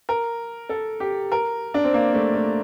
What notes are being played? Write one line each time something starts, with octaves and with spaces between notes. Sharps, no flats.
A#4
A4
G4
A#4
D4
C4
A#3
A3
A3